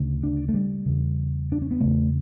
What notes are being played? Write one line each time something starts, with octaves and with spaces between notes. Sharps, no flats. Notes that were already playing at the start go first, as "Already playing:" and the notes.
Already playing: D2 C#3
D4
A3
G3
E2 C#3
D4
C#4
B3
E2 C#3 A3